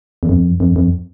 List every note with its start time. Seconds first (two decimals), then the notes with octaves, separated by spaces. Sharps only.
0.23 E2
0.29 F2
0.60 F2
0.76 F2